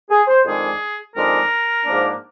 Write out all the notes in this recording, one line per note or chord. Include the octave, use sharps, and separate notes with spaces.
G#4
C5
F2 D#3 G#3 D4 G#4
F2 D#3 G#3 D4 A#4
G#2 F3 A#3 D4